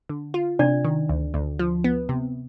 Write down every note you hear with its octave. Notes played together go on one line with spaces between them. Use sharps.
D3
F4
C3 D4 D5
D#3
D2
D2
F3
B3
C3